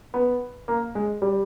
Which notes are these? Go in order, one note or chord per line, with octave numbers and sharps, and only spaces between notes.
B3
A#3
G#3
G3